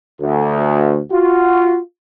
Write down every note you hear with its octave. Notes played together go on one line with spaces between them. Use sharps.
D2
F4 F#4